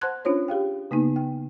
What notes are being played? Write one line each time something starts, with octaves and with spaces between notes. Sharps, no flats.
C5 F#5 A5 C6 F#6 G#6
C#4 D4 F4 C5 C#5
G4 G#4 F5 G5
C#3 A#3 B3 D#4
G5